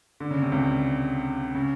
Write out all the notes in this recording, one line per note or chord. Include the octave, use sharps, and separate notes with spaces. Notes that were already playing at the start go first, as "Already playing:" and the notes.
D3
C#3
C3
C#2 C#3
C#3